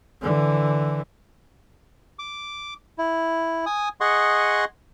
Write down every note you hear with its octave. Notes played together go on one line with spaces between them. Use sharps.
D3 E3
D6
E4
G#5 D#6
G#4 D#5 F#5 C6 C#6